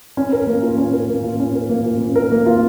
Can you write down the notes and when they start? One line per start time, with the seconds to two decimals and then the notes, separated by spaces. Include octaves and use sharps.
0.17 C#4
0.33 A#4
0.47 A#3
0.62 F4
0.78 C#4
0.93 A#4
1.09 A#3
1.24 F4
1.40 C#4
1.55 A#4
1.69 A#3
1.85 F4
2.01 C#4
2.16 A#4
2.32 A#3
2.46 F4